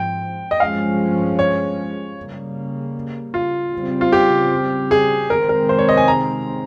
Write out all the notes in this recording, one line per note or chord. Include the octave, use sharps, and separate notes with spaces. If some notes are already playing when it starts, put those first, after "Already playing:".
Already playing: G#2 F3 C4 G5
D#5
G2 F3 G#3 C#4 F5
C#5
C#3 G3 A#3
F4
C#3 G3 C4
F4
G4
G#4
C3 D#3 G#3 C4 A#4
A#4
C5
C#5
D#5
G#5
A#5